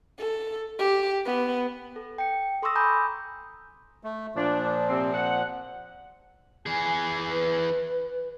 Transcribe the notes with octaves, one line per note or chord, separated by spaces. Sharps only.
A4
G4
B3
A4
G5 C#7
A4 C6 C#6 D#6 E6 A#6
G#5 A#5 B5 D6 D#6 G6
A3
A#2 F3 D4
C3 C4
F#5
E3 G#4 G#5
B4